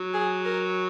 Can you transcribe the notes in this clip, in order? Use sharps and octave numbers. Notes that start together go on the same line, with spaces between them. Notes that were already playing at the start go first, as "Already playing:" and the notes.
Already playing: F#3
G#4
A#4